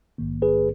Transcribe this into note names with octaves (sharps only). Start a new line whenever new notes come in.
A#1 G#2 D#3 A#3
G#4 B4